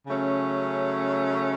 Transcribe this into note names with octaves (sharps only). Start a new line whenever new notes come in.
C#3 F#3 A3 C#4